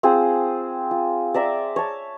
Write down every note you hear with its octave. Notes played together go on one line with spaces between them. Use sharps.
C4 F4 G#4 C5
F4
D5 E5 A#5 D6
C#5 A5